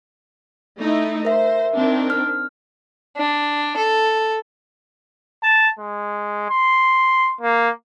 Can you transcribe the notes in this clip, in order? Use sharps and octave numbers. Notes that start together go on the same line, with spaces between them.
A3 D#4 E4
A#4 C5 E5
D#3 C4 D4
F6
D4
A4
A5
G#3
C6
A#3